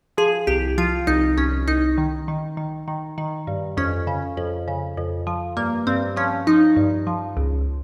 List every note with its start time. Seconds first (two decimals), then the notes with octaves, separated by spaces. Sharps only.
0.18 F3 G#4
0.47 C2 G4
0.78 F3 F4
1.07 C2 D#4
1.37 C2 C#4
1.67 C2 D#4
1.98 D#3
2.28 D#3
2.57 D#3
2.88 D#3
3.18 D#3
3.47 G2
3.77 F2 C#4
4.07 C#3
4.37 F2
4.68 C#3
4.97 F2
5.27 F3
5.57 G2 A#3
5.87 G2 C4
6.16 F3 C#4
6.47 F3 D#4
6.76 G2
7.07 F3
7.37 C#2